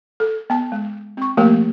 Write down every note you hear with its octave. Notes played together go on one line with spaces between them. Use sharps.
A4
B3 A5
G#3
C4 C#6
F3 A3 A#3 G4 A#4